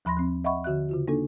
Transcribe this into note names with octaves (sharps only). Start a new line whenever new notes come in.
D#2 F3 B5 C6 A#6
F3 C4
D#5 E5 F#5 B5 C#6
D3 F#4 E5 F#6
C#3 F4 F#4
A#3 D4 D#4 A4